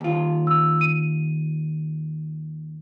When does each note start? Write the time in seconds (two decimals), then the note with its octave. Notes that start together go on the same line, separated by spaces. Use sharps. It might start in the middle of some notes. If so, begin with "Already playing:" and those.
0.01 D#2 F4
0.47 E6
0.81 D#7